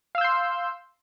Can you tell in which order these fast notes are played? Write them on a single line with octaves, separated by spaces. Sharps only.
F5 E6 G6 C6